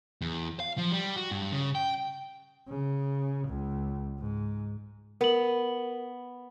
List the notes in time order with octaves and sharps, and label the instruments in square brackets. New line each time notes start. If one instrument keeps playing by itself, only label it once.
[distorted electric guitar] E2
F5
F3
G3
F#4
G2
C#3
G5
[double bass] C#3
C#2
G#2
[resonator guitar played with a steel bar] B3 [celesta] A#4 F#7